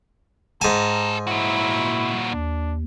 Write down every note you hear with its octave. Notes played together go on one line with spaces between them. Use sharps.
G#2 G4 A4 G#5 A#5
A#2 E4 F#4
D#2 D4